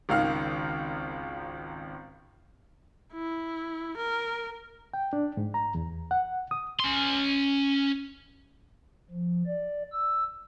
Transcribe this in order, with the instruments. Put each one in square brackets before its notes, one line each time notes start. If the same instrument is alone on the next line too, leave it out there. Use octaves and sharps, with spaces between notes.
[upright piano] G#1 C#2 D#3 F5 F6
[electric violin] E4
A#4
[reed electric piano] G5
D4
G#2
A#5
E2
F#5
D#6
[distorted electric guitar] C#4 C6
[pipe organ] F3
D5
E6